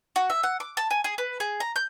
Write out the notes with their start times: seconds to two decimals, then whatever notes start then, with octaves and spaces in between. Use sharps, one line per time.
0.16 F#4
0.30 E5
0.43 F#5
0.60 D6
0.77 A5
0.91 G#5
1.04 G#4
1.18 B4
1.40 G#4
1.60 A#5
1.76 G6